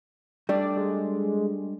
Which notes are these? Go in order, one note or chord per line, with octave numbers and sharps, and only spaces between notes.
G3 A3 D4 D5
G#3